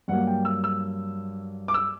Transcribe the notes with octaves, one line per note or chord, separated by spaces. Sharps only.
G2 F#3 A#3 F#5
G5
E6
E6
D6
E6